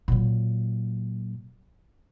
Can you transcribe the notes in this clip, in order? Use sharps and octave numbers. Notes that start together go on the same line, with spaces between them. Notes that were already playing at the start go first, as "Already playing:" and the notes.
A#2 F#3